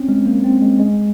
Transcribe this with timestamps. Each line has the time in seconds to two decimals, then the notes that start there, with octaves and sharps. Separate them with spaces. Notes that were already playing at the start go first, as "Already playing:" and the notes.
Already playing: C4 C#4
0.09 G#3
0.26 A#3
0.44 C4
0.62 G#3
0.79 G#3